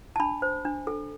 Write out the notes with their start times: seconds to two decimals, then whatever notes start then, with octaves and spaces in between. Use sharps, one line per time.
0.16 A5
0.20 D4 B5
0.42 C5
0.65 D4
0.87 A4